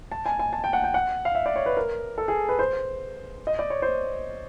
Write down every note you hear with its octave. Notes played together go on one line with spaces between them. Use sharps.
A5
G#5
G#5
A5
G5
F#5
G5
F#5
F5
E5
D5
C#5
B4
A#4
A4
G#4
B4
C5
D#5
D5
C#5
C5